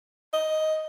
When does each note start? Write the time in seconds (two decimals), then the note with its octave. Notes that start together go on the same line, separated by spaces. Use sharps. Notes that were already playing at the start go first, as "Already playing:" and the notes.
0.33 D#5